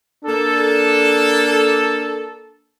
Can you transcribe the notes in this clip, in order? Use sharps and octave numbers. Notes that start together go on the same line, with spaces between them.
A#3 D4 A4